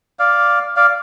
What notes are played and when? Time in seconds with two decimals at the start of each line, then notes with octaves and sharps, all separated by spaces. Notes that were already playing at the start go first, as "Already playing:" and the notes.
0.19 D5 F5
0.76 D5 F5